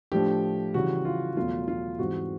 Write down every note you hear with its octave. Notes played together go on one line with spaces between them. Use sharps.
A2 F3 A3 D4 G4
C#3 E3 G3 F#4
F4
E2 B2 F#3 A3 F4
F4
G#2 E3 G3 C4 F#4